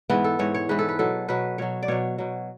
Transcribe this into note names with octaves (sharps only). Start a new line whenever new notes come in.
G#2 E3 B3
A4
G#2 E3 C#5
C#5
G#2 E3 B4
A4
B4
B2 F#3 A4
B2 F#3 B4
B2 F#3 C#5
D5
B2 F#3 C#5
B2 F#3